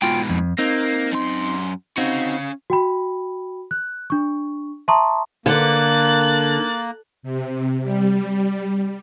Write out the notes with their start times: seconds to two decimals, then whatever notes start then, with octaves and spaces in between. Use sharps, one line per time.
0.02 G#2 B2 F4 G5
0.29 F2
0.59 A#3 C4 D#4
1.12 F#2 C6
1.97 C4 C#4 D#4 F#4 F5
2.70 F#4 G5 B5
3.71 F#6
4.10 D4 C#6
4.88 E5 A5 A#5 C6 C#6 D#6
5.46 D3 A#3 F#6 A6
7.23 C3
7.83 G3